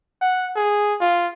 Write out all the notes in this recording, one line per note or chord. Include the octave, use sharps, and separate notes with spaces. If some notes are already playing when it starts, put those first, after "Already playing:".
F#5
G#4
F4